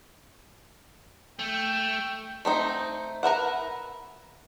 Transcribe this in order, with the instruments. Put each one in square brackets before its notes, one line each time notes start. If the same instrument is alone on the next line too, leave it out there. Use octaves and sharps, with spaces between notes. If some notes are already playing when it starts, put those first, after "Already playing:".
[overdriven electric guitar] A3 [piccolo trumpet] G5
[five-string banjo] A3 C4 D#4
A#4 B4 E5 F#5